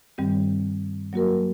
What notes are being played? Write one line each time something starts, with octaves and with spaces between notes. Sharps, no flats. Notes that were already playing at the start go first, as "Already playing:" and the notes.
G2 D#3 G3 C4
F#3 A#3 F#4 A#4